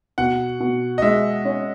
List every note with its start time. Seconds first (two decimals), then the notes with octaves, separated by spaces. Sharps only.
0.18 B2 F#5
0.60 B2
0.98 D#5
1.02 G#3 E5
1.45 C#4